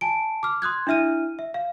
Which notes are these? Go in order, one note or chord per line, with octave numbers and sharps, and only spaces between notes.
G#5 A5 D7
D6 F6
C6 D#6 F#6 G#6
D4 E4 E5 F6 D#7
E5
F5